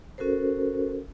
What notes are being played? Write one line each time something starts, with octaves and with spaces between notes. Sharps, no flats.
C#4 F#4 A4 A#4 C5